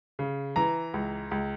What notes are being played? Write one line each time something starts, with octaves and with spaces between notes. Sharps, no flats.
C#3
E3 A#5
C#2
C#2